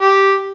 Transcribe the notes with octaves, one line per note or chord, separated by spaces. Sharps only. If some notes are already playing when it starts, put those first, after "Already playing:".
G4